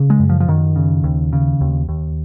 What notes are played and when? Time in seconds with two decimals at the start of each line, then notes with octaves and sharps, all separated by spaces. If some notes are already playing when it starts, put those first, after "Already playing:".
Already playing: C#3
0.10 G#3
0.20 F#2
0.30 F3
0.40 F3
0.48 F#2 D#3
0.76 C#3
1.04 D#2
1.33 C#3
1.61 D#2
1.89 D#2